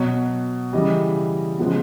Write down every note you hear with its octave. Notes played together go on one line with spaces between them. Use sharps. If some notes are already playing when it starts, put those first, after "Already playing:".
Already playing: B2 F#3 B3 C#5
C#3 E3 G3 D#5
C#3 F3 G#3 B3